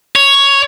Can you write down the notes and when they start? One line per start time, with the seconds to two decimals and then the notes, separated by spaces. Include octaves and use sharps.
0.15 C#5